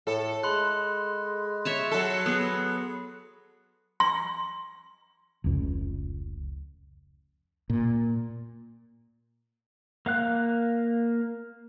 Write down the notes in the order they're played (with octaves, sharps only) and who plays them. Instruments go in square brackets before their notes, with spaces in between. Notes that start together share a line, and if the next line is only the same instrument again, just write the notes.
[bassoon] A2 [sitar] A4
[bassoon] G#3 [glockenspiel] B5 C6 F#6
[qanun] C#5 E5 A5
[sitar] F#3 A4
[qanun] B3 G#4
[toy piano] C6
[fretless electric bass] F1 C#2
A#2
[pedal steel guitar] A#3 F5 F#6